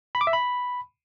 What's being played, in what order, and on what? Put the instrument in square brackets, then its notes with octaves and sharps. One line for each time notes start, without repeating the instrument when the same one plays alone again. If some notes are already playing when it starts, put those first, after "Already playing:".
[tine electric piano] B5
D6
E5
B5